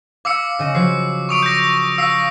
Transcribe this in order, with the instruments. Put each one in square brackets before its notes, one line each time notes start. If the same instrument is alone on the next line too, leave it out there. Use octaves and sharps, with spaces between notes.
[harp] F5 [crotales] D6 E6 C#7
[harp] C#3 D#5
[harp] F3 F#3 [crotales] C7
[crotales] C#6 D#6 D7
G6 A#6
[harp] F5 [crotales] E6 C7